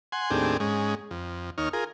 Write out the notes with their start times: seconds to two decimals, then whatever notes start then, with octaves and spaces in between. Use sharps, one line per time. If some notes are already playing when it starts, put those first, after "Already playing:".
0.12 F#5 G#5 C6
0.30 D#2 A2 C4 D4 G4 G#4
0.60 G#2 G#3 C#4
1.11 F2
1.58 D#2 D#4 C#5 F6
1.73 F4 G#4 A#4